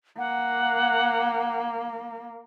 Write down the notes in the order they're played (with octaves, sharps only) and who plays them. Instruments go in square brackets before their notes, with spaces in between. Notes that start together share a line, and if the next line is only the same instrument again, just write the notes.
[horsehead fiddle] A#3 [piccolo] F#5